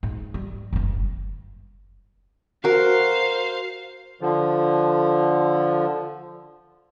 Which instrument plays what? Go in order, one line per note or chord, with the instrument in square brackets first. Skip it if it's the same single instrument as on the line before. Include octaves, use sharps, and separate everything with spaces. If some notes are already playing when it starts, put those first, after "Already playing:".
[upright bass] G#2
G3
F#1 G2
[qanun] F#4 A#4 [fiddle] C5 F5
[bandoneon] D3 F3